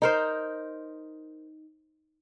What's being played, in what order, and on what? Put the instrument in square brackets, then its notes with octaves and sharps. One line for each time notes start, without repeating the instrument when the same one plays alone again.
[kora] D#4 A#4 C5